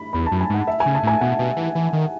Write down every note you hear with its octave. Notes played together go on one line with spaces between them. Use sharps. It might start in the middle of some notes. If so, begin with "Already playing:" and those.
Already playing: B5
E2 B5
A5
F#2
G#5
G#2 F#5
E5
G#5
C#3
A5
A2 G#5
B2 F#5
B2
E3
E3
D#3